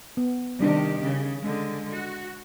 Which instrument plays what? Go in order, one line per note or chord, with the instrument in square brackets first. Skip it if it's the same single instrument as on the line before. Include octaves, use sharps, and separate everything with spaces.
[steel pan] B3
[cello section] C3 D#3 G4 [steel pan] G3 D4
[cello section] C#3
D3 G#3
F#4